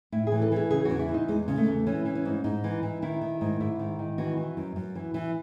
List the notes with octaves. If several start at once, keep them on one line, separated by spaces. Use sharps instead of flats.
A2 E4
G#4
E3
A4
E3 G#4
C#3 G#4
E2 F#4
E4
E3
D#4
E2 G#3
C#3
A3
E2
E3 C#4
E3
C#4
G#2
G#2 D#4
E3
E3
D#3 E4
D#3
G#2
G#2 E4
D#3
D#3
E3 F#4
E3
F#2
F#2
E3
E3